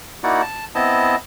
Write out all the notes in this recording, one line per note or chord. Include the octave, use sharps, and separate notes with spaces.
A#3 D#4 E4 F#4 D5 F#5
A5
B3 C4 E4 D#5 A5